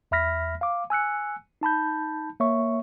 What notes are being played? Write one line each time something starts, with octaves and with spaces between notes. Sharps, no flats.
E2 E5 B5 F6 A#6 B6
F5 D6
G#5 E6 F#6 C#7
D#4 A5 B5 G6
A#3 C#5 E5 C#6